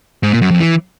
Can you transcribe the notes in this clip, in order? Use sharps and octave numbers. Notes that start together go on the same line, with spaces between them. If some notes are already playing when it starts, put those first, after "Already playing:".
G#2
A#2
F#2
F2
E3